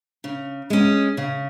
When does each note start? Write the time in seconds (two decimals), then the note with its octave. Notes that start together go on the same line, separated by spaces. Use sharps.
0.24 C#3
0.70 G#3 C#4
1.17 C#3